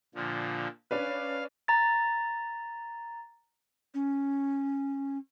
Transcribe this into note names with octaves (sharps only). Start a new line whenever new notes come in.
A#2 D3 F3
C#4 D4 B4 F5
A#5 A6
C#4